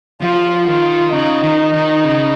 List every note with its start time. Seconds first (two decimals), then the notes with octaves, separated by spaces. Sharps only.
0.22 F3 F4
0.67 D#3 F4
1.13 C#3 D#4
1.43 D#3
1.74 D#3
2.05 C#3